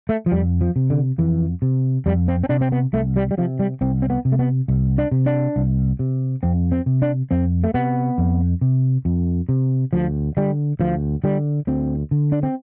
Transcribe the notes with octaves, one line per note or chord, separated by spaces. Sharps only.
A3
F3
F2 G3
F3
C3
D3
F2 E3
C3
F2 G3
C4
C4
C3 D4
C4
B3
C2 A3
G3
G3
C3 F3
G3
C2 C4
C4
B3
C3
A3
B3
C2
D4
C3
D4
C2
C3
F2 C4
C4
C3
D4
F2 C4
A3
C3 B3
F2
C3
F2
C3
D2 F3
D3 G3
D2 F3
D3 G3
D2 C4
D3
D4
C4